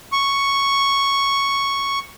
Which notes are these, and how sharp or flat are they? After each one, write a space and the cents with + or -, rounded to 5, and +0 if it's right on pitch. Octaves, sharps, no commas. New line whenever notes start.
C#6 +0